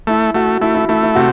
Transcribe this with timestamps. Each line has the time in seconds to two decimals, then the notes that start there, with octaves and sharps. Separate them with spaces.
0.07 A3 E4
0.35 A3 F#4
0.61 A3 E4
0.75 E4
0.89 A3 E4
1.03 E4
1.15 C3 F#4